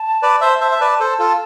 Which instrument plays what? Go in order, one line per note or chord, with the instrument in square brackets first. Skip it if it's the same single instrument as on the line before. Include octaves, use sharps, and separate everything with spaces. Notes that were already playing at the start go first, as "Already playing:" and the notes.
Already playing: [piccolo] A5
[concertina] B4 D5
C5 E5
C5 E5
E5
B4 D5
A4 C5
F4 A4